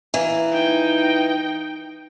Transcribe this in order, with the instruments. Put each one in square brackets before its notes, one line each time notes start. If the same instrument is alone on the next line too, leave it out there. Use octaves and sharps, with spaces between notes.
[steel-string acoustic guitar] E3 A#3
[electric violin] D#4 G5